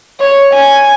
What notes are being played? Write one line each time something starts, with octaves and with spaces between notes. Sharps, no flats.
C#5
G#5